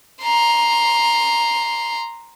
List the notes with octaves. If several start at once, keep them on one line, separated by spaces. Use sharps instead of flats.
A#5 C6